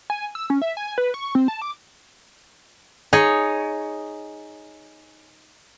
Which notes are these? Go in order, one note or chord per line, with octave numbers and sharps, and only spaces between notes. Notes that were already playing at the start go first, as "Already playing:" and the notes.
G#5
E6
C#4
E5
G#5
B4
C#6
C4
A5
D6
D#4 G#4 C#5